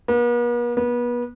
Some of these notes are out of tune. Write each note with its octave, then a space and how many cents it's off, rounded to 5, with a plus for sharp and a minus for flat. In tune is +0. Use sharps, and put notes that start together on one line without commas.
B3 -45
B3 -30